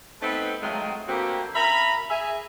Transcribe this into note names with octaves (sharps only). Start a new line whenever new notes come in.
A3 B3 C4 D#4 A4 B4
D#3 F#3 G#3 A3 C4 F4
D3 A#3 C4 F#4 G4 B4
C#4 A#4 E5 A#5 B5
G#4 E5 G#5